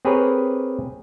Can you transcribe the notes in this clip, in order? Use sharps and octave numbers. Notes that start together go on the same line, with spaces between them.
C4 G4 G#4 A#4 B4 C#5